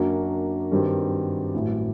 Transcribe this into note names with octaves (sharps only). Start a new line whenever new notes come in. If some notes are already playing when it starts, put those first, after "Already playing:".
Already playing: F#2 F#3 A#3 D4 F#4
G2 D#3 G3 C4 F#4
A1 A2 F#3